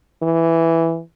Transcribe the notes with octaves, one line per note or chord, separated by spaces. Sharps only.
E3